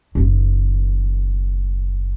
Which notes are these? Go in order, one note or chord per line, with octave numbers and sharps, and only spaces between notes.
F#1 D#3